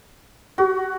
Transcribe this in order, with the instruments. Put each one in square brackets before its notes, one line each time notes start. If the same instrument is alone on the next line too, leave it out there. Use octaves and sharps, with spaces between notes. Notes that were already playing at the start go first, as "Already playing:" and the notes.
[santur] F#4 [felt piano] G4 C#6